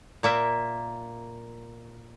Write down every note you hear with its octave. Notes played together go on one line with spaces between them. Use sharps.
A#2 A#3 E5